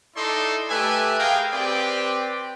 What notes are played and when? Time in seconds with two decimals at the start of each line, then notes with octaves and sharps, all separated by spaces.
0.16 D#4 E4 A4 D5 C6
0.70 A3 G4 B4 E5 G#5
1.19 G#4 A#4 F5 G5
1.52 C4 G4 B4 D5 G5